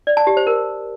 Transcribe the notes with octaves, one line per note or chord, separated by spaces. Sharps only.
D5
A5
G4
C5
A#4